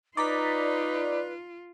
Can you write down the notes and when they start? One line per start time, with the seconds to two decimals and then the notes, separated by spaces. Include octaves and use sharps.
0.17 D#4 F4 B4 D5 A#5 B6